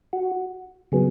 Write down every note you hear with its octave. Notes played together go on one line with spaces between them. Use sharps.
F#4
C#3 F#3 B3 G#4